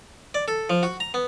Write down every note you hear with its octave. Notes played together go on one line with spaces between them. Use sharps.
D5
A4
F3
F#4
A#5
B3